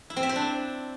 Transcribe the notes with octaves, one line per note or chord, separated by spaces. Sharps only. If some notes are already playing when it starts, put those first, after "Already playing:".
E4
C4
E5
C5
D4